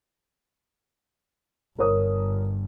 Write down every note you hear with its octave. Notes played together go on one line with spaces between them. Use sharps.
G1 A#4 C#5 D#6